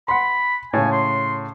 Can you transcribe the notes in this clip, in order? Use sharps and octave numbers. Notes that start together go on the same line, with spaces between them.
F#5 B5 C6
A2 C#3 G#5
C6